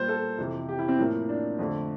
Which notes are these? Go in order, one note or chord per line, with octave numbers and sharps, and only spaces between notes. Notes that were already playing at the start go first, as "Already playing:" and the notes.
Already playing: A#2 G3 A#3 C5
A4
F2 C3 E3
G4
E4
C4
A2 F3 A#3
D4
F2 D3 A3